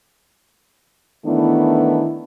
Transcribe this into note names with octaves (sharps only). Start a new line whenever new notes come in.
D#3 E3 A3 B3 D4 E4